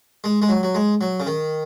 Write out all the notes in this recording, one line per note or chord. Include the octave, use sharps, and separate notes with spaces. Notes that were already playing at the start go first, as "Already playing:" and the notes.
G#3
G#3
F#3
F#3
G#3
F#3
C#3
D#3